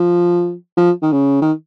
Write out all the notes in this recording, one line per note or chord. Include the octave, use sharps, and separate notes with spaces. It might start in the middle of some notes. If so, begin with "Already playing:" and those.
Already playing: F3
F3
D#3
C#3
D#3